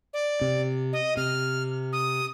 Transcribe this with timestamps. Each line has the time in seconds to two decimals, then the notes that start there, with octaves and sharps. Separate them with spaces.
0.13 D5
0.41 C3
0.93 D#5
1.17 C3 F6
1.93 D#6